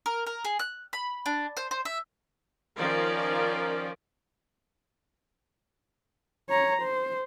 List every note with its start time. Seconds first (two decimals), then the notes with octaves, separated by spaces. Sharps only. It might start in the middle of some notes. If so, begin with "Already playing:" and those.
0.06 A#4
0.26 A#4
0.44 G#4
0.59 F#6
0.93 B5
1.26 D4
1.57 C5
1.71 C5
1.85 E5
2.77 D#3 F3 C#4 F4 A#4 D5
6.49 C#5 A#5
6.82 C5